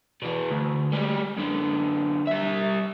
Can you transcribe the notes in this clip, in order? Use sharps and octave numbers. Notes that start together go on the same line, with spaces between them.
B2 E3
D2
G3 G#3
F#2 D3
G3 E5